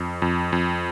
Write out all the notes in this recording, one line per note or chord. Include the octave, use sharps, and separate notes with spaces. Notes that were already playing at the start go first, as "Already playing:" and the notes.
Already playing: F2
F2
F2